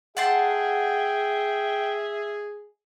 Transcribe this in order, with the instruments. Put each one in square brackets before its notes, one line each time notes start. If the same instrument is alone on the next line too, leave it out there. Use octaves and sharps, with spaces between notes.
[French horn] G#4 [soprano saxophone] E5 [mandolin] F#5 A5 C6 [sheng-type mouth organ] G5